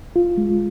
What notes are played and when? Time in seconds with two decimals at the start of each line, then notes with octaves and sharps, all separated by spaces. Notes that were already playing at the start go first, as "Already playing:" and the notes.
0.16 F4
0.38 G#3